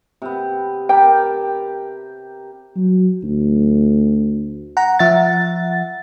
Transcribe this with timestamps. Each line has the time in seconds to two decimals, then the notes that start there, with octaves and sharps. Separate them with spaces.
0.22 C3 B3
0.89 G4 A#4 G5 A5
2.76 F#3
3.24 D2
4.77 F#5 A#5
4.99 F3 E5 F#5 A6